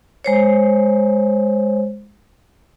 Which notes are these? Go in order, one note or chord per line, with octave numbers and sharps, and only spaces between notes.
G#3 C5 C#5